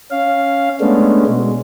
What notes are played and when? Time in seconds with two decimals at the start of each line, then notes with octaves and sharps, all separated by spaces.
0.11 C#4 F5
0.80 G#3 A3 B3 C#4 D4
1.27 B2 G#3